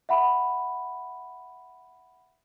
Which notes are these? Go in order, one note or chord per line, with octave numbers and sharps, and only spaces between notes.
E5 F#5 B5